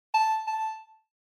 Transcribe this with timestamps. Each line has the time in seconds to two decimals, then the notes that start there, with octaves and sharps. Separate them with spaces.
0.14 A5
0.47 A5